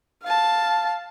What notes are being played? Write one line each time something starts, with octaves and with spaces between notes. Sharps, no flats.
F5 A5